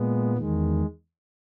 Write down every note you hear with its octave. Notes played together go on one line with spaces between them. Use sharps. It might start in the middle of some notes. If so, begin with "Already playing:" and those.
Already playing: A#2 G#3 B3
E2 D#3 G#3